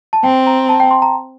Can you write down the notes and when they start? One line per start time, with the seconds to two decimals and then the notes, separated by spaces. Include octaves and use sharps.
0.13 A5
0.24 C4 G5
0.47 A#5
0.69 A5
0.80 G5
0.91 C6
1.02 A#5